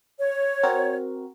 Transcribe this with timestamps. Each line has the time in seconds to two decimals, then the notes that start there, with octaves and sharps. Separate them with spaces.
0.19 C#5
0.63 C4 F#4 A#4